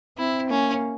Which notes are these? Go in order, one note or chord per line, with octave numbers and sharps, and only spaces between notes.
C4 E4
A#3 C#4